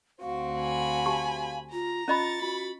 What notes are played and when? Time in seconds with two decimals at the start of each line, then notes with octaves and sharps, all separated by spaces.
0.21 D2 C4 F#4 F5
0.60 G#5 B5
1.06 G4 A5 C#6
1.73 F4 A#5
2.08 C#4 F4 D#5 B5 C#6 A6
2.42 F4 F#4 B5